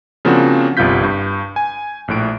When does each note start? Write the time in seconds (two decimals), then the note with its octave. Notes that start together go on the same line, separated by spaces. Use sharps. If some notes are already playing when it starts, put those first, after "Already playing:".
0.25 C#3 F3 A#3 C4 D4 F#4
0.77 G1 C2 G3 F4 G6 B6
1.04 G2
1.56 G#5
2.08 A#1 A2 D7